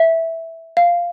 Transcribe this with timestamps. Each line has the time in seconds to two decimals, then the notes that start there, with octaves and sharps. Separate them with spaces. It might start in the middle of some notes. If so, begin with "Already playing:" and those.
Already playing: E5
0.77 F5